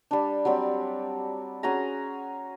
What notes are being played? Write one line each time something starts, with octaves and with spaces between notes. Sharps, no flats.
G3 D4
F#3 G3 C4
C#4 F#4 G#4 A#5